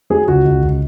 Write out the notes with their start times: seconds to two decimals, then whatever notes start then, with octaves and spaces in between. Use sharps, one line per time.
0.10 F#3 G#4
0.28 C#2 F#4
0.45 C#2
0.63 C#2